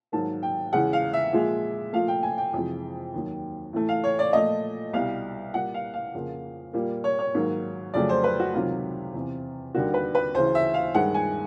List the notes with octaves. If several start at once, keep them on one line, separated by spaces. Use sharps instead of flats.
G#2 D#3 F#3 A#3 A5
G5
E2 C#3 E3 G#3 F#5
F5
E5
A#2 F3 G#3
A#2 F3 A3 F5
G5
G#5
G5
F2 C3 E3 G#3
D#2 D#3 F#3
A2 E3 A3
F5
C#5
D5
A#2 F3 A3 D#5
C2 B2 G3 F5
A#2 G3 A#3 F#5
F5
F5
F2 C#3 F3 A#3
A#2 G3 A#3
C#5
C#5
G#2 D#3 F#3 A#3
F2 C#3 F#3 A3 D5
C5
B4
F#4
C#2 C3 D#3 F#3 F4
E2 C3 E3
D#2 D3 G3 A#3 F#4
B4
B4
D2 C#3 E3 C5
E5
F5
G2 D#3 G#3 F#5
G#5